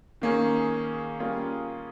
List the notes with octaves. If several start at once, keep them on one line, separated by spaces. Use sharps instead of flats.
D#3 A#3 C#4 G#4
G3 A#3 C#4 F4 G#4